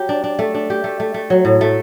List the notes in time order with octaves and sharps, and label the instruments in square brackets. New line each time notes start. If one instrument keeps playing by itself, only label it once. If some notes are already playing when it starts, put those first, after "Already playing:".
Already playing: [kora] F#3 G4
D4
D4
A3
D4
G4
A3
A3
A3
F#3
A2
A3